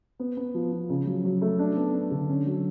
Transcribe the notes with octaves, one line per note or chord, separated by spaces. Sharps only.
B3
B3
F3
F3
C#3
F#3
F#3
A3
D4
B3
D4
D3
C#4
F#3